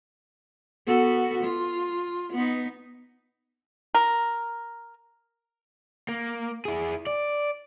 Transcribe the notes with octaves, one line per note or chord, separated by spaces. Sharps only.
B3 F#4 A4
F4
B3 D#4
A#4
A#3
E4 G#4
D5